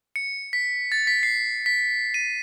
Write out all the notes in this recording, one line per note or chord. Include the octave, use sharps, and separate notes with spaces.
C#7
B6
A6
B6
C7
B6
D#7